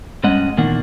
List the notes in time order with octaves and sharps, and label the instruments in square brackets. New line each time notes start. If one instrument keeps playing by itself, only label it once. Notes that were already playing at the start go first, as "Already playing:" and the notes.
[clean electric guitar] G2 G#3 C#4 D#5 F#5
E2 A#2 D#3 A#3 D4 F#5